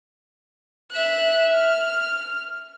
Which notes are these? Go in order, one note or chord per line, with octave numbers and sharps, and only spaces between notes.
E5 F#6
F6